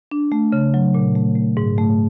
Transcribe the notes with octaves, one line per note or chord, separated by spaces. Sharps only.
D4
A3
C#3
F#3
A#2
A3
A3
G#2
A3